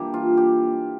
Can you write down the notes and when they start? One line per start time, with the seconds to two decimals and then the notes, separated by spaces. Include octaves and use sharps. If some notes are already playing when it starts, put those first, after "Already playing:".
Already playing: E3 G3 A#3 D4 G4
0.14 F4
0.37 G4